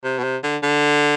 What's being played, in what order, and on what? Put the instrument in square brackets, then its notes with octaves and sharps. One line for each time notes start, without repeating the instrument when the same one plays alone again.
[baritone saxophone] C3
B2
C3
D3
D3